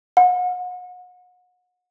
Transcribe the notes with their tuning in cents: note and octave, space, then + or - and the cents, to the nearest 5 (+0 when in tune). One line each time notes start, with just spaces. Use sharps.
F#5 -35